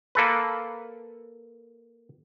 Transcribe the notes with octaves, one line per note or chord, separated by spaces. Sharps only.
A#3 A4 B4